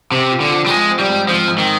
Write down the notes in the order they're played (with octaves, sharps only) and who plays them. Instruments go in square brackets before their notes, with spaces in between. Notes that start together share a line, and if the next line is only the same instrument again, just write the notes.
[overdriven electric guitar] C3 [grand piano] C4
[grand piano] F4
[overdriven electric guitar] D3
[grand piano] F3
[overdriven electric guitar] G3
[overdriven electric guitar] G#3 [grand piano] F4
[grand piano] C4
[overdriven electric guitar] G3
[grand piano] G#2
[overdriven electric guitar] F3 [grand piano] C4
[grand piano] G#2
[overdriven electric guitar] D#3